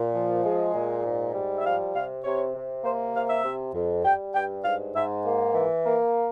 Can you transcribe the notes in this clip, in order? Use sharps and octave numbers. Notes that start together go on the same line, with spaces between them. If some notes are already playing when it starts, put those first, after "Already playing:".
Already playing: A#2
F3
G#3
A#2
G#2
G3
E5
F3 F5
C3 F5
C3 C#5
C3
A#3 C5
C3 F5
E5
C3
F2
G3 G5
G2 G5
G#2 F5
G#2 E5
A#3
E3
A#3